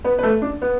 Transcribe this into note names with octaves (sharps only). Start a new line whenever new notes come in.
B3 B4
B4
A3 A4
D4
B3